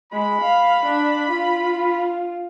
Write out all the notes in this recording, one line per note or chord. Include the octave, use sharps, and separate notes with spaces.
G#3 B5
F5
D4
F4